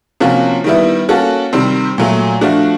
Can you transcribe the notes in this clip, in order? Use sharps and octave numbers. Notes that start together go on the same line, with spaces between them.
C3 F3 A#3 C#4 F#4
D#3 G3 B3 E4
A#3 C#4 F#4 A4
C3 D#3 G3 C4
A#2 F#3 A3
F3 A3 D4 F#4